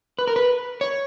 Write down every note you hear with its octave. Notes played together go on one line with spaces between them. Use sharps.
B4
A#4
B4
C#5